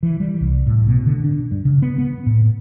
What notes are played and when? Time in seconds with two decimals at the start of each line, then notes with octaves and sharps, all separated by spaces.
0.03 E3
0.20 G3
0.41 C2
0.67 A2
0.87 B2
1.06 D3
1.24 D4
1.51 G2
1.65 C#3
1.82 B3
1.98 B3
2.26 A2